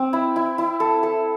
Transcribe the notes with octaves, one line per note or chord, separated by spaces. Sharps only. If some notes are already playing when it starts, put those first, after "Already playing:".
Already playing: C4
E4
E4
E4
A4
A4